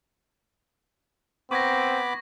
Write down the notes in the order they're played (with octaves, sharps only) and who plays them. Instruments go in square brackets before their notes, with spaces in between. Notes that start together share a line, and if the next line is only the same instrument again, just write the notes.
[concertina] B3 B5 D6 [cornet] C4 [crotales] C#6 G#6 A#6